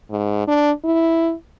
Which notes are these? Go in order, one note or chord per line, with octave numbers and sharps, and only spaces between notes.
G#2
D4
E4